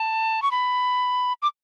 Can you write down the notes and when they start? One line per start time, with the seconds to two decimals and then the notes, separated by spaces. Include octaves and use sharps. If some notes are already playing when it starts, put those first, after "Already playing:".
Already playing: A5
0.42 C#6
0.51 B5
1.42 D6